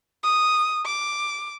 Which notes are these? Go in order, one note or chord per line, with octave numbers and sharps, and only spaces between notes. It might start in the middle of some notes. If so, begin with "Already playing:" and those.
D#6
D6